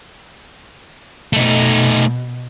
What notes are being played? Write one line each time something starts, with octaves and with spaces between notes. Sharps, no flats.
B2 A3 D#4